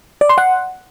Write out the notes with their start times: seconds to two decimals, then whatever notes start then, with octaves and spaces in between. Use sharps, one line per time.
0.21 D5
0.29 C6
0.38 F#5